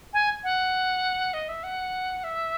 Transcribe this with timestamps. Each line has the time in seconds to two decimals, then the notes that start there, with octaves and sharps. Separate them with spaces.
0.13 G#5
0.44 F#5
1.34 D#5
1.49 E5
1.63 F#5
2.24 E5